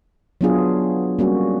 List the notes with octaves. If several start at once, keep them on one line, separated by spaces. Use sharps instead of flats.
F#3 B3 D4 F4 G#4
G3 A#3 C#4 F#4